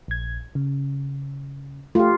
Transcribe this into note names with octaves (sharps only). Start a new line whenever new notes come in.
A#1 G#6
C#3
A3 F4 G4